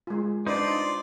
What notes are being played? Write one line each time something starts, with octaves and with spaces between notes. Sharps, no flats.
G#3 F4
D4 D#4 F4 B4 C5 D5